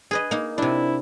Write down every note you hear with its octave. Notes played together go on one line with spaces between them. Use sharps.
G#4 B4 D#5
A#3 D#4
C3 D4 E4